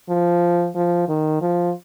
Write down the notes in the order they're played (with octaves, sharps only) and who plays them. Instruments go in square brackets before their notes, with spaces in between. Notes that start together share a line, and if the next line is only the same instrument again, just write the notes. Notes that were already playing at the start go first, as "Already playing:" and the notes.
[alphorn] F3
F3
D#3
F3